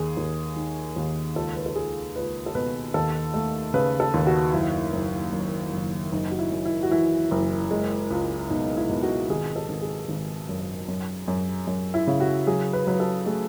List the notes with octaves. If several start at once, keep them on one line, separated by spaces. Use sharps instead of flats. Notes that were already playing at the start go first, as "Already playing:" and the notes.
Already playing: D#2 G#4
D#2
D#3
D#2
C#2 A4
B4
A4
C#2 G#4
C#2 B4
A4
B2 B4
D#2 A4
A3
C#3 B4
A4
D#2
F#4
F#1 E4
F#1
F#2
F#1
F#1 D#4
F#4
E4
F#2
E4
F#4
E3 E4
F#1
G#3
C#2
B2 D#4
E4
B2
F#4
G#1 G#4
A4
G#1
G#4
G#1
F#2
F#2
F#2
F#2
E4
C#3
F#4
F#3 G#4
B4
F#3 B4
A4
A3 G#4